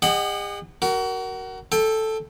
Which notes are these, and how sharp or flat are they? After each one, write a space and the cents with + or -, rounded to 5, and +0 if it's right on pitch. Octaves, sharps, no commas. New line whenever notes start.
G#4 -45 D#5 -25 F#5 +20
F#4 +30 A#4 +0
A4 +0 G5 +25